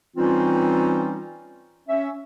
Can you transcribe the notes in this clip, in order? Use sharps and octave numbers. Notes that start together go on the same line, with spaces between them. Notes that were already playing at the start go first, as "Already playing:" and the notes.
E3 G3 C4 C#4 D#4 F4
C#4 E5